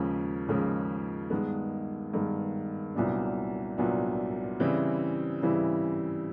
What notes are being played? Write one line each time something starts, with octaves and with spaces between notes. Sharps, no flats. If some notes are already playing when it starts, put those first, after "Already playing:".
Already playing: D#2 C#3 F3 G#3 C#4
D#2 C#3 F3 G#3 C#4
G2 D#3 G#3 B3
G2 D#3 G#3 B3
C2 A#2 F#3 B3 D4
C2 A#2 F#3 B3 D4
C#3 E3 G3 C4 E4
C#3 E3 G3 C4 E4